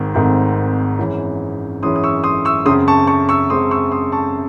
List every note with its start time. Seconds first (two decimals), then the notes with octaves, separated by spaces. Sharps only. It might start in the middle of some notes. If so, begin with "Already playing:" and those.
Already playing: G#1 G#2 D#3 C4
0.14 G#1 G#2 D#3 A3 C4
0.98 F#2 E3 G#3 C#4
1.82 F#2 E3 G#3 C#4 C6 D#6
1.96 D#6
2.04 C#6 E6
2.24 C6 D#6
2.45 C#6 E6
2.66 F#2 C#3 G#3 C4 C6 D#6
2.88 A5 C#6
3.07 A5 C#6
3.29 C#6 E6
3.50 F#2 C#3 G#3 C4 C6 D#6
3.71 C#6 E6
3.91 C6 D#6
4.12 A5 C#6